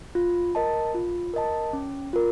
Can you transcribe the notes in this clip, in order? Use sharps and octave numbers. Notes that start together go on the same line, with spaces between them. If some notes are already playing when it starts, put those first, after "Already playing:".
F4
A#4 D#5 A5
F4
A#4 D#5 A5
C#4
F4 A#4